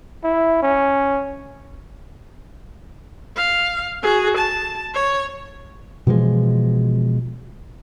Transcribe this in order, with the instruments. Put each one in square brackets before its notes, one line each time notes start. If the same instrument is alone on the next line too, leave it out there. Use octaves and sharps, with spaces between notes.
[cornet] E4
C#4
[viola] F5
F#4 G#4
A5
C#5
[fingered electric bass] B2 E3 F3 G#3